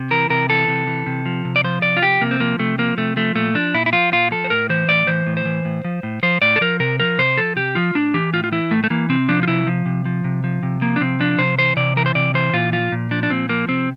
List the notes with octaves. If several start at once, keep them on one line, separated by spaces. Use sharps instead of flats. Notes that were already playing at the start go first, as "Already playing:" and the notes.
Already playing: C3
E3 A#4
C3 A#4
E3 A4
C3
E3
C3
F3
C3
D5
F3 C5
C3 D5
F4
F3 G4
C3 A#3
C4
F3 A#3
C3 A3
F3 A#3
C3 A3
F3 A3
A#2 A3
F3 D4
A#2 E4
E4
F3 F4
A#2 F4
F3 A4
C5
A2 A#4
E3 C5
A2 D5
E3 C5
A2
C5
E3
A2
F3
A2
F3 C5
A2 D5
A4
F3 A#4
C3 A#4
F3 A#4
C3 C5
F3 A4
C3 G4
F3 F4
A2 D4
E3 G4
A2 F4
F4
E3 E4
A2 A3
A3
E3 A#3
C3 C4
F3 D4
F4
C3 E4
F3
C3
F3
C3
F3
C3
F3 A#3
D4
C3 C4
F3 D4
C3 C5
E3 C5
C3 D5
E3 A#4
C5
C3 D5
E3 C5
A#2 F4
F3 F4
A#2
F3 D4
D4
A#2 C4
F3 A#3
C3 C4